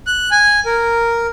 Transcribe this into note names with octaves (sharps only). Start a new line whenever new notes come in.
F#6
G#5
A#4